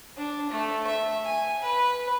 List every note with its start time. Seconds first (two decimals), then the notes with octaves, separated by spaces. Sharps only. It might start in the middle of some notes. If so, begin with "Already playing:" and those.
0.17 D4
0.50 A3
0.87 E5
1.25 G#5
1.62 B4